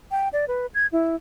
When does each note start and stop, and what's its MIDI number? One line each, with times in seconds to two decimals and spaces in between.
0.11 0.28 79
0.33 0.45 74
0.48 0.66 71
0.74 0.86 92
0.92 1.16 64